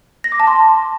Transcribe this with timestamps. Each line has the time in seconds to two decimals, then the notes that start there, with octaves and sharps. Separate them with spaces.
0.24 A#6
0.32 D6
0.40 A5
0.47 C6